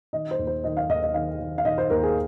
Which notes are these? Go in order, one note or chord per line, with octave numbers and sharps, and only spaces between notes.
D#3 D#5
C5
D#2
C5
D#3 D#5
F5
D#2 D#5
D#5
D#3 F5
D#3
F5
D#3 D#5
C5
D#2 A#4
G#4